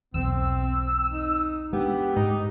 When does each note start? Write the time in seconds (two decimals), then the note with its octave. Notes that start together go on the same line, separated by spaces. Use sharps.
0.14 B1 E2 C4 E6
1.10 D#4
1.73 G#3 B3 C4 D4 G4
2.16 G#2 G#3 D#4